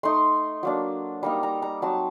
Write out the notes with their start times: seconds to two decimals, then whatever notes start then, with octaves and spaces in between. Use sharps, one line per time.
0.03 A3 D#4 C6
0.63 F#3 A#3 D4
1.23 G3 A#3 D#4 A#5
1.43 A#5
1.62 A#5
1.82 F#3 C4 D#4 A5